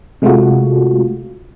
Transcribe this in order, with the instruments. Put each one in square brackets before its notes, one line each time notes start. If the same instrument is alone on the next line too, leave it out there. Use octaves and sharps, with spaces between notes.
[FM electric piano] C3 G#3 A3 F4 F#4